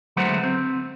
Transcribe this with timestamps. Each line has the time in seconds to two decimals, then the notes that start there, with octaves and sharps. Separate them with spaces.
0.17 D3 F#3 G#3 A3 B3 C5
0.44 C4